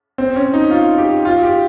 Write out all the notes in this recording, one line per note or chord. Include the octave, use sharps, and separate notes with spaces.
C4
C#4
D#4
F4
G4
F4
G4